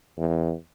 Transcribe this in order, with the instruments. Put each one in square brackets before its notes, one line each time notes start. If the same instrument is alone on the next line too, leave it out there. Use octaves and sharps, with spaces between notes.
[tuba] E2